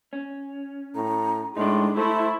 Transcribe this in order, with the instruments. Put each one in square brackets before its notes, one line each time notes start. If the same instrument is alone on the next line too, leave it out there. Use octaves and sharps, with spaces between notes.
[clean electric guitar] C#4
[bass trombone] A2 [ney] A#5
[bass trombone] A2 [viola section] G#3 [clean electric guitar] D4 D#4 [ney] C6
[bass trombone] A3 [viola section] E4 [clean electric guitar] C5 E5 [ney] C6